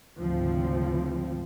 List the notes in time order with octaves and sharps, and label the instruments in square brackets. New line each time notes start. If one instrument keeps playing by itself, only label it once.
[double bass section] G#1 D2 C#3 F3 C4